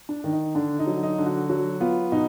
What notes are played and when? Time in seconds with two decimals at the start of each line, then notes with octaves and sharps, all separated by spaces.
0.09 D4
0.24 D#3
0.32 D#4
0.55 D3 D4
0.79 D#4
0.87 F#3
1.03 D#4
1.18 D3
1.26 F#4
1.49 F#3 F#4
1.81 B3 F4
2.12 B2 D#4